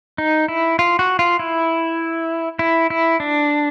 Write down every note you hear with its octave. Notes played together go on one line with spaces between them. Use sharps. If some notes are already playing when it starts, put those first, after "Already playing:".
D#4
E4
F4
F#4
F4
E4
E4
E4
D4